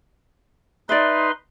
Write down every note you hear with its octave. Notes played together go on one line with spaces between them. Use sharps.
D#4 B4 D5 E5 C6